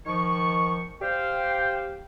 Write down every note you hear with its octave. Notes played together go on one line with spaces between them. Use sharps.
D#3 F3 C#6
G4 C5 F5 G5